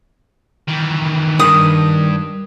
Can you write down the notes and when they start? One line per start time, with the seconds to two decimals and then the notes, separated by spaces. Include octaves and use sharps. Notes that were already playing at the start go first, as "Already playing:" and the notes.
0.68 D#3 E3
1.39 G2 D#3 D#6